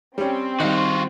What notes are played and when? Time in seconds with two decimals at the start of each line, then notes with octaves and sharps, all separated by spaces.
0.18 G3 C4 C#4
0.60 D#3 G3 D#4 F4 F#4